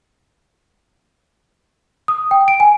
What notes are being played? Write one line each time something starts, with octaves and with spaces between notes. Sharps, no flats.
D#6
G5
D7
G#5